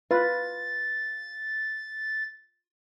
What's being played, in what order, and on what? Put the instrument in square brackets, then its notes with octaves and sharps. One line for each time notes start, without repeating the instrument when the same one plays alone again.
[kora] F4 [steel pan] B4 [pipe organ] A6